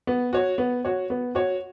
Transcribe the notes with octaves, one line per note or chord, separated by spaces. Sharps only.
B3
F#4 C#5
B3
F#4 C#5
B3
F#4 C#5